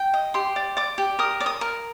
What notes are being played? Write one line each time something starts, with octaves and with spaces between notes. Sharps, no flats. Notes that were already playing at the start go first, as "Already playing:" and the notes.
Already playing: G5
D#5
G4 C6
D5
D5 D6
G4
A#4 D#6
D5
D#6
A#4